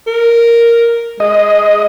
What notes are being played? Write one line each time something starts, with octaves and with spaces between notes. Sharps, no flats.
A#4
G#3 D#5